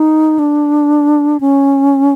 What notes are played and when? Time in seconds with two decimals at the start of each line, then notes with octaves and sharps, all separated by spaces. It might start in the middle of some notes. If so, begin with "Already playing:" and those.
Already playing: D#4
0.39 D4
1.40 C#4